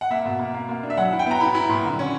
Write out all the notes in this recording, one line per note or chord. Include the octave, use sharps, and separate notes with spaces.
F#5
A#3 E5
B2
A#3
A#3
A#3
D4
E5
F#3 F#5
E4
G5
B3 A#5
E4 B5
E4
A#2
D3
C#4